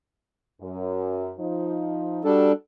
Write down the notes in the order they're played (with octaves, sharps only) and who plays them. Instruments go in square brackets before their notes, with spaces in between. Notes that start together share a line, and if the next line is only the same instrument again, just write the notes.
[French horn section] F#2
F3 D#4
[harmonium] G3 D4 A4 [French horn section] F#4